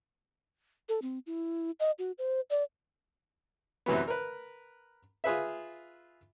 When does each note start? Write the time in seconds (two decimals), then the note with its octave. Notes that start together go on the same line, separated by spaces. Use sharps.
0.89 A4
1.02 C4
1.27 E4
1.80 D#5
1.99 F#4
2.18 C5
2.50 D5
3.86 F#2 C3 E3 F#3 B3
4.08 A#4 B4
5.24 F4 G#4 B4 E5